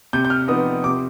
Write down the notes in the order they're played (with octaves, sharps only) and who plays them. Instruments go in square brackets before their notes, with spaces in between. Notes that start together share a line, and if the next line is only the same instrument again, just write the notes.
[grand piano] C3 G6
G6
F6
F3 B3 D#4 D#6
C3 D6